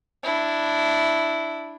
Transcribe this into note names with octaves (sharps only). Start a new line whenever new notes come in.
D4 E4